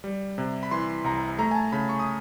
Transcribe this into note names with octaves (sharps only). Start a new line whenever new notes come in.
G3
C3
B5
E3 C6
C2 A#5
A3 A#5
G#5
A5
C#3 B5
C#6
D#6